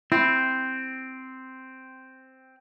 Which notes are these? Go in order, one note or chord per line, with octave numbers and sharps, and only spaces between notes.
C4 E4